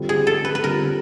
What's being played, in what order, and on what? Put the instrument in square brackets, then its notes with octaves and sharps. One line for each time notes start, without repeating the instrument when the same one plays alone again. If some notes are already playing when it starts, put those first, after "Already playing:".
Already playing: [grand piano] D3 G3 C4 F4
[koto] G#4
A4
B4
B4
[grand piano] D3 G3 C4 F4 [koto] A#4